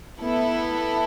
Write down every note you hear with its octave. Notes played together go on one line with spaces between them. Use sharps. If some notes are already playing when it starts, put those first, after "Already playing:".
B3 E4 A4